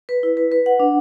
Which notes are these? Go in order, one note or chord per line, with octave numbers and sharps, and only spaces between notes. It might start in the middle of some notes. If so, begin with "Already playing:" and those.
B4
E4
B4
B4
F#5
D4